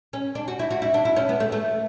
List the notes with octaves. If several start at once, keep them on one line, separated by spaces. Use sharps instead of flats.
C#4
D4
F#4
E4
F#4
E4
D4
E4
C#4
B3
A3
A3